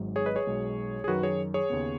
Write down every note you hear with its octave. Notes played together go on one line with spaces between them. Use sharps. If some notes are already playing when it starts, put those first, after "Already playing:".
Already playing: G#1 G#2 F#3
G#4 C#5
B4 D#5
G#4 C#5
B1 B2 G#3
G#4
F#2 D#3 F#3 F#4 B4
G#4 C#5
G#4 C#5
D#2 C#3 B3